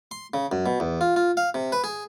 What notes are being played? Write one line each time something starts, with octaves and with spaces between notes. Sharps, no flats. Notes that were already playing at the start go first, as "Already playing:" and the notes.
C6
C#3
F#2
B2
E2
F4
F4
F5
C3
B4
G#4